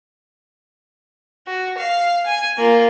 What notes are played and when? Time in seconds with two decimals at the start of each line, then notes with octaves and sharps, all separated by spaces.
1.47 F#4
1.78 F5
2.26 G#5
2.58 A#3 F4